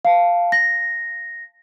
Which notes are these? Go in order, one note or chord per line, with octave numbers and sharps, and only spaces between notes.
F5 A5
A#6